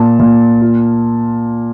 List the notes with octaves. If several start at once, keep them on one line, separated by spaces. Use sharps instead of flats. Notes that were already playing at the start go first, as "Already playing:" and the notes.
Already playing: A#2 A5
A#2
F4